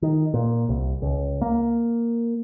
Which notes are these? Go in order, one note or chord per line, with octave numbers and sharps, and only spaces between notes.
D#3
A#2
C2
C#2
A#3